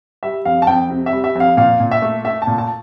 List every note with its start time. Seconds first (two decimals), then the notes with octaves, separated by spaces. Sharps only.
0.23 G3 E5
0.45 F2 F5
0.62 A5
0.67 F2 G5
0.90 C3
1.06 E5
1.13 G3
1.24 E5
1.35 F2 F5
1.57 A#2 F5
1.80 A#2
1.91 E5
2.02 A3
2.24 A3 E5
2.42 A5
2.47 A#2
2.58 A5